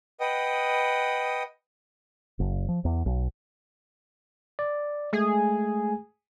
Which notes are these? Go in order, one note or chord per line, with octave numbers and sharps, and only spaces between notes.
B4 D#5 F#5 G5 D#6
F#1
F3
E2
B1
D5
G#3 A3 G#4